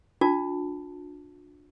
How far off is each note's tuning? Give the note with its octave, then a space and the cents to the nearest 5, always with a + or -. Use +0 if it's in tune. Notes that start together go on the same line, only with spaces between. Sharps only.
D4 +0 F4 +45 A5 +0